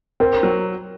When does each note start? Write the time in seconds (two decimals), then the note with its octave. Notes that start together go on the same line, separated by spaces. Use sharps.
0.20 C4 A#4
0.43 F#3